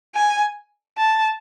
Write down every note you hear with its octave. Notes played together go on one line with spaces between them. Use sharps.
G#5
A5